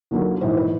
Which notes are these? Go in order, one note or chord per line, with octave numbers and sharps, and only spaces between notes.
D#2 D3 F#3 A#3
A#1 G#2 E3 C5
B4